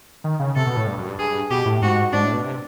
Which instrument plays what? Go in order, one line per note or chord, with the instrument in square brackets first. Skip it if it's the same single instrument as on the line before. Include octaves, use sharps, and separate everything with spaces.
[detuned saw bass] D#3
C#3
[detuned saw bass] C3 [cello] A4
[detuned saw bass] B2
A2
G2
F#2
G2
[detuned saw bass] G2 [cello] G#4
[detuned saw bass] B2 [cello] G4
[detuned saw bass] A2
[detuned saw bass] G#2 [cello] F#4
[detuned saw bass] G#2 [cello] D4
[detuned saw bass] A2
B2
C3